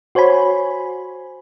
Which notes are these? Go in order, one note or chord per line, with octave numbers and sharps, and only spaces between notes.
F#4 C5 C#5 G#5 B5